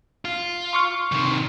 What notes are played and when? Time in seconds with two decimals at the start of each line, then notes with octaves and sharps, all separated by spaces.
0.25 F4
0.73 C6 C#6 F6
1.12 C3 D#3